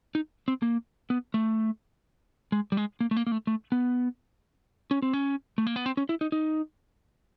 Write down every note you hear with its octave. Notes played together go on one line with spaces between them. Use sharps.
D#4
C4
A#3
B3
A3
G#3
G3
G#3
A#3
A3
A#3
A#3
A3
A3
B3
C#4
C4
C#4
A3
A#3
B3
C4
C#4
E4
D#4
D#4